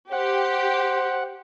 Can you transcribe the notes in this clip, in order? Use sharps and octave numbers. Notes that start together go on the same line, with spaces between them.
G4 C5 F#5